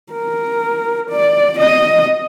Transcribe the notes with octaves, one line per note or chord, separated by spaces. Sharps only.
A#4
D5
D#5